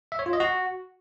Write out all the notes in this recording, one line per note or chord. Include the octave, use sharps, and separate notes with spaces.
E5
C#5
F4
D#5
F#4